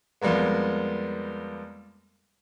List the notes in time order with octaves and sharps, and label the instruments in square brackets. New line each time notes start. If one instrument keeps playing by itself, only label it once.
[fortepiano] F2 G3 G#3 A#3 B3